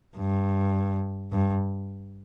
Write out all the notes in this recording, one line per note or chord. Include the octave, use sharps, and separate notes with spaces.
G2
G2